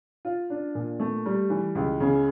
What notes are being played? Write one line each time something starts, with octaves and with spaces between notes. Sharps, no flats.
F4
D4
A#2
A3
G3
E3
C#2
C#3